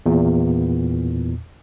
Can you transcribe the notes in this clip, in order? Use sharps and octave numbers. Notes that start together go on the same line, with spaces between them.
E2 A#2